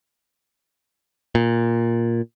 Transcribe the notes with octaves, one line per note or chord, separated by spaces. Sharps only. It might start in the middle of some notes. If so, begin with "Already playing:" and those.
A#2